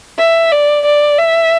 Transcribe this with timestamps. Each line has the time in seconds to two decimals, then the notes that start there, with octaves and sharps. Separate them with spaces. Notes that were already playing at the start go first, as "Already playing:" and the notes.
0.19 E5
0.52 D5
0.85 D5
1.18 E5